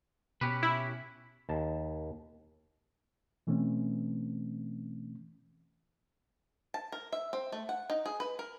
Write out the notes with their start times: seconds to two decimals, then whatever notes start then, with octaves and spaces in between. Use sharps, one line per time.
0.41 B2 C#4 G4 B4
0.63 E4
1.49 D#2 A5
3.47 B2 E3 A3 C4 C#4
6.74 A5
6.92 A#4
7.12 E5
7.33 C4
7.52 A3
7.69 F#5
7.90 D#4
8.06 G#4
8.20 B4
8.39 A#4